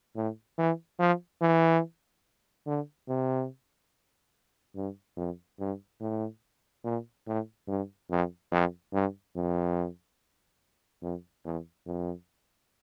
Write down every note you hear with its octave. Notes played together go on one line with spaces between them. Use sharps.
A2
E3
F3
E3
D3
C3
G2
F2
G2
A2
A#2
A2
G2
F2
F2
G2
F2
F2
E2
F2